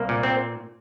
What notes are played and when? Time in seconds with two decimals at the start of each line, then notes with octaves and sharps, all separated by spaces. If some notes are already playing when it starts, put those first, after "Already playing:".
Already playing: C2 A#3
0.09 A#2
0.23 C4